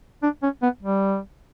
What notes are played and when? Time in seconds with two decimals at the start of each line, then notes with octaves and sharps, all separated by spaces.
0.23 D4
0.43 C#4
0.62 B3
0.82 G3